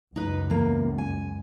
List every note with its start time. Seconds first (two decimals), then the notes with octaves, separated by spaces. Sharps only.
0.16 C#2 F#2 D#4 B4
0.50 E2 A#3
0.98 G#5